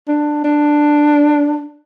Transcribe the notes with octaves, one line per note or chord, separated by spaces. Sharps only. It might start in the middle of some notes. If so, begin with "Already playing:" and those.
D4
D4